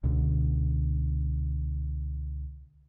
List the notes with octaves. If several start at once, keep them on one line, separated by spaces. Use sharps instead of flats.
C#2 B2 D3